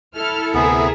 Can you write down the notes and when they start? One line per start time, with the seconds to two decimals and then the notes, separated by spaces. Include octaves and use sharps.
0.15 E4 A4 F6
0.54 D2 C3 B3 G#4 A#4 C5 E5